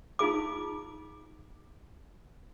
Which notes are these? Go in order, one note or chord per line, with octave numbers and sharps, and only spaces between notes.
D#4 F4 G#4 D6